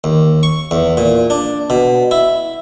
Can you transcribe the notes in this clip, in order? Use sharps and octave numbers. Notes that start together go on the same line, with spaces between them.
D#2
C#6
E2
A#2
D4
B2
E4